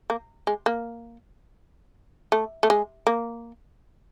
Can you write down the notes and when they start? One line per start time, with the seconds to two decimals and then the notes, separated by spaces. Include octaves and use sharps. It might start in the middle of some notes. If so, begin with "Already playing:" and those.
0.10 A#3
0.47 G#3
0.66 A#3
2.32 A3
2.63 A3
2.70 G#3
3.07 A#3